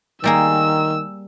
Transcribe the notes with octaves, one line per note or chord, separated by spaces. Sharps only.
D#3 G3 A#3 G#4 E6